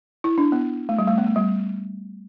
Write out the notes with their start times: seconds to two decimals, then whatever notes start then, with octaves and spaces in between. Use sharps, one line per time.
0.24 E4
0.38 D4
0.52 B3
0.89 A3
0.99 G3
1.08 A3
1.18 B3
1.26 A3
1.36 G3